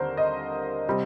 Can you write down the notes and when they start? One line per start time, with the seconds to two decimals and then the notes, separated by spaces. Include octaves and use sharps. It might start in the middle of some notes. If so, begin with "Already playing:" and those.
Already playing: D#2 D3 G3 C4 A#4 C5
0.17 D#5
0.89 C3 G3 C4